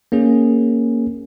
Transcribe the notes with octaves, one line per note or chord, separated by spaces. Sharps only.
A#3 C#4 G#4